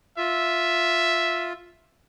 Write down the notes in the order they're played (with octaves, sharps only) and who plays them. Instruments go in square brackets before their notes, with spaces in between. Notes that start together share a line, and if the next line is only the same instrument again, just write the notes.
[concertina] F4 [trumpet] E5